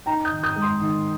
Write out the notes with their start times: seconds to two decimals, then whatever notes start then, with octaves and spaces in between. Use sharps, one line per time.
0.06 D#4 G5 A#5
0.25 D#6 G6
0.31 D#3
0.43 D#6 G6
0.56 G#3
0.62 C6 D#6
0.81 D#3